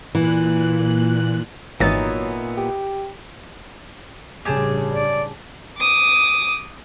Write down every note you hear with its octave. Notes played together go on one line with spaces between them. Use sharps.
A#2 E3 F#6
G#1 A#2 E3 F#3 B3 D#4 A6
G4
A1 G2 C#3 G4 G#4 A5
D5
D6 D#6